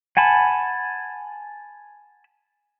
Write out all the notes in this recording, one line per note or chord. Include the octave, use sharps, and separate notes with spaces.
F#5 G#5 A5 B5